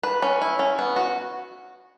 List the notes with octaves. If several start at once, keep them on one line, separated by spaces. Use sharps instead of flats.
B4
C#4
E4
C#4
B3
F#4